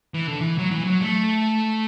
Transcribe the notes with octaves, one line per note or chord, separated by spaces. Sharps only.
E3
D3
E3
F#3
E3
F#3
A3